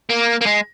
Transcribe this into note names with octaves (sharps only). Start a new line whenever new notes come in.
A#3
A#3
G#3